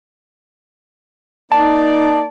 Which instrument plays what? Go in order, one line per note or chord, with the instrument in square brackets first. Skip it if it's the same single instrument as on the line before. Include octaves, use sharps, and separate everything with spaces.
[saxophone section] A#3 D5 [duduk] D#4 [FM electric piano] A5